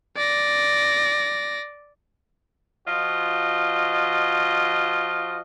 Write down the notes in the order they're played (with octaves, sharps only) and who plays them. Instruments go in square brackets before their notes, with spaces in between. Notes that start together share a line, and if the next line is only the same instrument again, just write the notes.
[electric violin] D5 A#6
[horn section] F3 F4 F#4 D#5